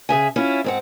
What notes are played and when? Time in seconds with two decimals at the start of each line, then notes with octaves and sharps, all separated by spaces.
0.09 C#3 G#4 E5 G#5
0.36 C#4 E4 F4
0.64 G#2 C4 F#5